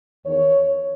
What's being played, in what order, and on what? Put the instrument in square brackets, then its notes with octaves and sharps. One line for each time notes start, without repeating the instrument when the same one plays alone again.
[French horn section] E2 D#3 C#5